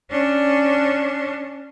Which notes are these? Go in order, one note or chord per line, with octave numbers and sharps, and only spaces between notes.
C#4 D4